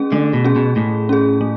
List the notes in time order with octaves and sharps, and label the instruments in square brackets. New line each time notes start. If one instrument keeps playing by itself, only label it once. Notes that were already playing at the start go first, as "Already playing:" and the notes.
Already playing: [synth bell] A3 C#4 G#4
[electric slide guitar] D3 [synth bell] A3
[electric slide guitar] B2
[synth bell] C#4 G#4
[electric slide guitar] B2
[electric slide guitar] A2 [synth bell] A3
[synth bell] C#4 G#4
A3